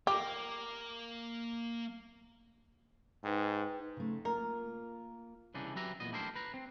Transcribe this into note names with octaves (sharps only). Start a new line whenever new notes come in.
A#3 G4 D6
G#2 D#4 B4 G5
C#3 A3
A#3 F4 A#4
C2 C#3 E3 D4 D#4
F#3 G4 B4 E5 A#5
E2 A#2 B3 D#5
G3 A3 D4 E4 A#4 C5
B4 A#5
C4